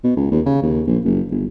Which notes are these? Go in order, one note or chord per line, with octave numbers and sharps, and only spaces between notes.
B2
C#2
D#2
C#3
D#2
A#1
F#1
G1